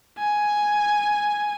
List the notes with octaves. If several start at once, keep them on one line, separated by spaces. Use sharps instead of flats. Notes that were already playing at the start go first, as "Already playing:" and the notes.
G#5